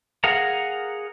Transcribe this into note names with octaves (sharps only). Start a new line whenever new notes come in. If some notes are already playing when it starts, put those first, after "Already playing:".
G#4 A#4 F5 F#5 A#5